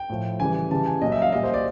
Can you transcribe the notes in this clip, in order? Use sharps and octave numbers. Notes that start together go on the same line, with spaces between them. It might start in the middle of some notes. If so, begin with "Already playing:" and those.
Already playing: G5
A2 F3
C#3 E3 G3 G#5
C#3 E3 G3 A5
G#5
A#2 F#3 D#5
E5
F5
A#2 G3 D#5
C5
D5